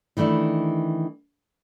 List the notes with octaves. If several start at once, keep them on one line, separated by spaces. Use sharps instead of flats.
D#3 E3 A3 D4 E4